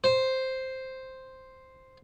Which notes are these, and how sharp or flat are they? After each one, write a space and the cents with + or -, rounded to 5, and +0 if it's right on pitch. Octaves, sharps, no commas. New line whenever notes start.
C5 +0